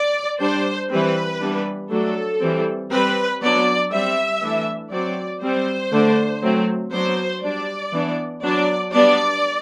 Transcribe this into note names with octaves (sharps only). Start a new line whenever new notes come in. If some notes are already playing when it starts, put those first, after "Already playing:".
Already playing: D5
G3 D4 C5
E3 G3 C4 B4
E3 G3 B3 D4
F#3 A3 D4 A4
E3 G3 C4
G3 C4 B4
F#3 B3 D4 D5
G3 C4 E5
E3 A3 D4
F#3 C4 D5
G3 C4 C5
D3 A3 D4
F#3 A3 C4
F#3 B3 D4 C5
G3 D4 D5
E3 B3 D4
F#3 B3 D4 D5
G3 B3 D4 D5